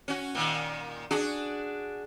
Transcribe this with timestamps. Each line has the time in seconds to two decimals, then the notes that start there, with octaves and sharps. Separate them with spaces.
0.08 C#4 F#4
0.35 A#2 D#3
1.11 D4 F#4 G#4